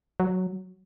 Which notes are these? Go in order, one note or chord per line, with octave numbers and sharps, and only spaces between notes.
F#3